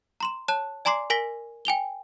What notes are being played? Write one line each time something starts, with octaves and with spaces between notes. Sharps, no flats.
A#5 C6 E7
C#5 A5 F#6 E7
D5 G#5 A#5 C6 D6 C7
A#4 G#5 A#6 B6 G7
G5 G#5 F7 G7